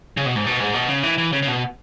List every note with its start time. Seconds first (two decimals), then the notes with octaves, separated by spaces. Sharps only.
0.17 C#3
0.26 B2
0.36 G#2
0.46 B2
0.60 G#2
0.74 B2
0.89 C#3
1.03 E3
1.18 E3
1.33 C#3
1.43 C#3
1.48 B2